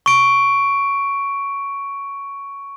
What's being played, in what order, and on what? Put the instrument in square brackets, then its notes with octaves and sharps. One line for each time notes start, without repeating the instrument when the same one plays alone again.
[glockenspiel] C#6 D7